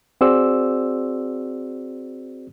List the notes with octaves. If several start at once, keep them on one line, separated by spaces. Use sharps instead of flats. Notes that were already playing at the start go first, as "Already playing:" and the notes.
C4 F#4 G#4 C5 D5 E6